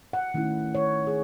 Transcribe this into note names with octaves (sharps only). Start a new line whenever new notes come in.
F#5
D#3 A3 C#4 E4
C#5
G#4